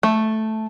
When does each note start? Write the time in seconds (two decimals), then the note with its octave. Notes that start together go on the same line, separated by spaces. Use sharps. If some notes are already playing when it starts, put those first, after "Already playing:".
0.03 A3